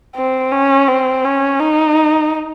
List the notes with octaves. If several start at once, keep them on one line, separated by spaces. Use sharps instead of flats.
C4
C#4
C4
C#4
D#4